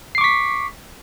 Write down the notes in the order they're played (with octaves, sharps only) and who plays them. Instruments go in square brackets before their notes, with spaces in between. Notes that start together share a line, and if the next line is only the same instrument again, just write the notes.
[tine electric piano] C7
D6
C#6
B6